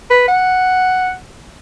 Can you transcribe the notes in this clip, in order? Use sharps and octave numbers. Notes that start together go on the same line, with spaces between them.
B4
F#5